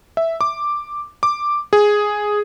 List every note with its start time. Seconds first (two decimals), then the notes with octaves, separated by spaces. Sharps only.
0.17 E5
0.41 D6
1.23 D6
1.73 G#4